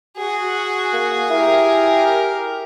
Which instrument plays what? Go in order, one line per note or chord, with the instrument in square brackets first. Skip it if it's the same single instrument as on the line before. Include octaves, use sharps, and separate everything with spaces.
[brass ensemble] F#4 [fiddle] G#4
[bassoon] A#3
[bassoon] E4 [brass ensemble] G4 A#4